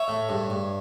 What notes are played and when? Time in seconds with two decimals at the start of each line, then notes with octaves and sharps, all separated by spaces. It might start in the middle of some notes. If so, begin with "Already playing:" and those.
Already playing: C#5 E5
0.08 A2
0.29 G2
0.50 G2